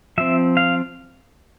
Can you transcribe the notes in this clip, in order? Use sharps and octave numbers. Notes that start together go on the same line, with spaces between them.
F3 C4 E5
F5